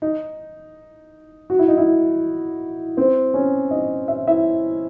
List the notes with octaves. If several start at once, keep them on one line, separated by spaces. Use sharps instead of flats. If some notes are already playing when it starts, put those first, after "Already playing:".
D#4
F#4
E4
D#4
E4
C4 C5
C#4 C#5
D#4 D#5
E5
E4 E5